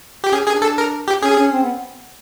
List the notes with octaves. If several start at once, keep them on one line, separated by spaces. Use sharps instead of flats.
G4
C#4 G#4
D4 G#4
A4
A#4
G4
C#4 G#4
C#4
C4
B3